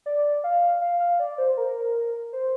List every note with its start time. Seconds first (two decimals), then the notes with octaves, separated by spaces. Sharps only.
0.06 D5
0.44 F5
0.82 F5
1.00 F5
1.19 D5
1.38 C5
1.57 A#4
2.33 C5